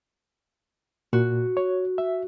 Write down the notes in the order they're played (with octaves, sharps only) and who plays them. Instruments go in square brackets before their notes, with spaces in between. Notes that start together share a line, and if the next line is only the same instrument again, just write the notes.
[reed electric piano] A#2 [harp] F#4
[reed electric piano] C#5
E5